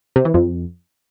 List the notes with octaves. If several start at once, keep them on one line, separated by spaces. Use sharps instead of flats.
C3
E3
F2